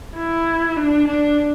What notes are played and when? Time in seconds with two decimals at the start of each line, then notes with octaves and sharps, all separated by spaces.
0.16 E4
0.76 D4
1.07 D4